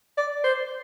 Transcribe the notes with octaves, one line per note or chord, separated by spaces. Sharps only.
D5
C5